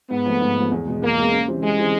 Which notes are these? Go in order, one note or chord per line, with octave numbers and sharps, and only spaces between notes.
G#2 B3
F3 A3
G#2
F3 A3
E2
B2 G#3 B3
E2 A#3
B2 G#3 B3
C#3
E3 G3 C4
C#3 G#3
E3 G3 C4